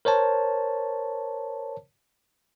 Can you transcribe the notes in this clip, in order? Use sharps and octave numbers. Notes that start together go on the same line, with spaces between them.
A#4 C5 C#5 A5